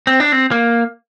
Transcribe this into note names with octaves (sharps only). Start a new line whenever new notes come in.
C4
D4
C4
A#3